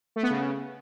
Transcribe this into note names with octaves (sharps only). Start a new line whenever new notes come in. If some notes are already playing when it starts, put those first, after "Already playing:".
A3
B3
C#3